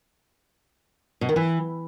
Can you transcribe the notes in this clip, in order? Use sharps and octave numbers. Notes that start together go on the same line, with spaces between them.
B2
D#3
E3